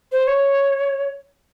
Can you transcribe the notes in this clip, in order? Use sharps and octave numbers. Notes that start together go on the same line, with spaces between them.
C5
C#5